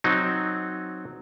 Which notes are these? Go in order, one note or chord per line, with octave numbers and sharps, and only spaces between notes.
F#3 C4 D#4